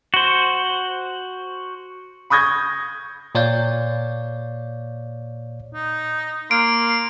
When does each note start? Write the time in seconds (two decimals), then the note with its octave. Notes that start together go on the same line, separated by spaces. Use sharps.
0.14 F#4 C5
2.30 B5 C#6 D#6 G6 G#6 A#6
3.35 A#2 C#5 D5 F5 G6
5.73 D#4
6.51 A#3 C6 D7